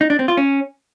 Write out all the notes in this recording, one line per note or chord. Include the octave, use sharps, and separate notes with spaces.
D#4
D4
C4
F4
C#4